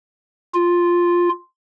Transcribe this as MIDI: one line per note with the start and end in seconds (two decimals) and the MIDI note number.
0.54 1.29 65